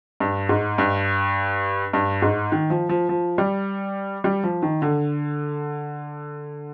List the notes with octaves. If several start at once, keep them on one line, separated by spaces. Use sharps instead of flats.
G2
G#2
G2
G2
G#2
D#3
F3
F3
F3
G3
G3
F3
D#3
D3